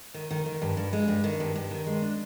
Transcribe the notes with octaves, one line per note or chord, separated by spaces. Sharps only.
D#3
D#3
D#3
G2
G2
G#3
G2
D#3
G2
G2
D#3
G#3
D4